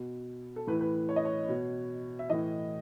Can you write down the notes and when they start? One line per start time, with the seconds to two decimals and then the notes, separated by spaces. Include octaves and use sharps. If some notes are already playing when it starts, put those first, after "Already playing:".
Already playing: B2
0.56 A4
0.67 A2 E3 B4
0.81 B4
1.09 C#5
1.16 D#5
1.25 C#5
1.49 B2
2.19 E5
2.30 A2 E3 D#5